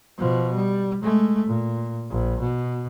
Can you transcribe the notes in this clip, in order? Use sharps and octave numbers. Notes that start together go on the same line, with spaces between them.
B2 F3
G3
G#3 A3
A#2
A#1
B2